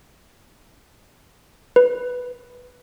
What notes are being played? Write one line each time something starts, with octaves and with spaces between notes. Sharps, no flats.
B4